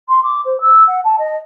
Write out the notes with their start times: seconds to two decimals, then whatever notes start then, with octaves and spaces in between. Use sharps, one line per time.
0.09 C6
0.23 D6
0.45 C5
0.61 E6
0.87 F#5
1.04 A5
1.18 D#5